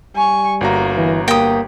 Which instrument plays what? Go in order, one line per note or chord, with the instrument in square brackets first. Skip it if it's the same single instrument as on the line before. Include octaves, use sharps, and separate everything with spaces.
[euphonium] G3 [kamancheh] G#5 C#6
[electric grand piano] G1 F#4 A#5 [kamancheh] A#3
[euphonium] E3
[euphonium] A#3 [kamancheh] G4 [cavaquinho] G5 D#6